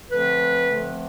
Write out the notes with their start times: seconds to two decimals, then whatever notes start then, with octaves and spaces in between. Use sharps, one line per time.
0.10 D3 F3 A3 C4 B4
0.70 D3 F3 A3 C4